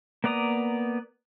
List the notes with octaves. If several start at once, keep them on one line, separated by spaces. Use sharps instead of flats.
A#3 B3 D5 A#5 D#6